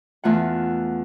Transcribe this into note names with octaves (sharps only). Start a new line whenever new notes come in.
E2 A3 F4 F#5